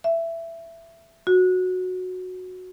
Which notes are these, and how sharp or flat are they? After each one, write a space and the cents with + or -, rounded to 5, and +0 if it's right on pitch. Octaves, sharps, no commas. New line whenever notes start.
E5 +15
F#4 -10